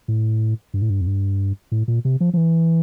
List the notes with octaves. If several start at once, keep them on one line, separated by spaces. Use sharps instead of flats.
A2
G2
A2
G2
F2
G2
A2
A#2
C3
F3
F3
E3